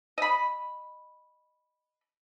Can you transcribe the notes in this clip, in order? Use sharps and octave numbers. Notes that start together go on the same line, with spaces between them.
D#5 B5